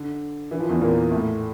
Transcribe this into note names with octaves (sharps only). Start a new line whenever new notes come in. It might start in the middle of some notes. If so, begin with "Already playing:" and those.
Already playing: D3
E3
F3
E2 E3
A#2 A#3
A2 A3